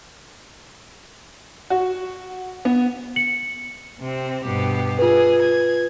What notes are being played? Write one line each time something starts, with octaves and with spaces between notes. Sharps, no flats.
F#4
B3
C#7 F#7
C3 C4
G2 B2 G4
F4 G#4 B4
G#6